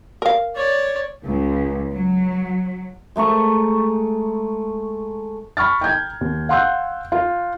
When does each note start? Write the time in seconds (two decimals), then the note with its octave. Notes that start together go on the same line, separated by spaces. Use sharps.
0.22 A#4 F5
0.55 C#5 D5
1.28 C#2
1.91 F#3
3.16 G#3 A3 A#5 C#6
5.57 B5 C#6 F6 A6
5.81 G5 A#5 G6 G#6
6.21 D#2
6.49 F5 F#5 C6 E6 F#6 G6
7.12 F4